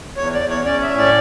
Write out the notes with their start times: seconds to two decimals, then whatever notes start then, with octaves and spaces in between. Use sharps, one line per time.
0.17 E2 C#5
0.34 D5
0.41 E2
0.50 C#5
0.65 C#4 D5
0.83 E5
0.91 A2
0.98 D5